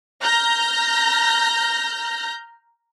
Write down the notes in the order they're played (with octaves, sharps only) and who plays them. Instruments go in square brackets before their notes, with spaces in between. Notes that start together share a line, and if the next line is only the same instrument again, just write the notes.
[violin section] A#5 F6 G6 A#6